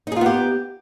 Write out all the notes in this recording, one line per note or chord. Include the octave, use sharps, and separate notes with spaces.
B3 D#4 F4 G4 G#4